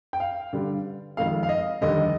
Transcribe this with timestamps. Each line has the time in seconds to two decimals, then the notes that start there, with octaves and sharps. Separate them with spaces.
0.13 G5
0.20 F5
0.53 G2 D3 G3
1.17 F1 F2 D#3 G#3 F5
1.43 F5
1.49 D#5
1.81 F1 D#2 D3 G3 D#5